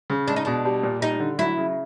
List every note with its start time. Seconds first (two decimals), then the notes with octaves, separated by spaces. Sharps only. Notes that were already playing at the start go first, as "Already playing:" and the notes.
0.10 C#3
0.28 G#3 D4
0.36 D#4
0.45 B2 D4
0.65 G3
0.83 A#2
1.01 G3 D#4
1.20 D3
1.38 F#3 E4
1.57 C#3